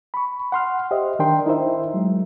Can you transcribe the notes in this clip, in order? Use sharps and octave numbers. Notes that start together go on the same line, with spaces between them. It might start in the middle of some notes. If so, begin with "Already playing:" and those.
B5 C#6
F#5 C6 F6
G4 C5 D#5 E5
D#3 D4 A#4 G5 C6
D#4 E4 A#4 C5 E5
F#3 G#3